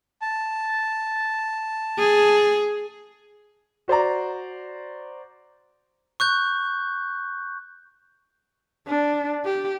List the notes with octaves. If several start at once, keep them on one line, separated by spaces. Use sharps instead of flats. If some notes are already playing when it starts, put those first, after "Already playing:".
A5
G#4
F#4 C5 D5 A#5
C#6 F#6 G6
D4
G4